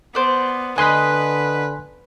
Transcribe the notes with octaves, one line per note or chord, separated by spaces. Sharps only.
B3 C5 D5
D3 B4 D#5 G#5 B5 C6 F#6